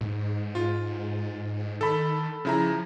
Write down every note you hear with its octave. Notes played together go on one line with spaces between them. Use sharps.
G#2
F4
D#3 A4 B5
C#3 F3 E4 A#5